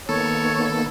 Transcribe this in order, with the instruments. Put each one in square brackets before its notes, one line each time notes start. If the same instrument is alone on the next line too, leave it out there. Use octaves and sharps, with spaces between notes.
[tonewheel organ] D#3 A#3 B3 [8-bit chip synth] A4 [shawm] C#5